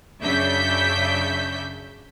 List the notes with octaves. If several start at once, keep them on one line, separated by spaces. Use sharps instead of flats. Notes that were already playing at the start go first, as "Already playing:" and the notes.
F#2 C#3 D4 E5 G6 B6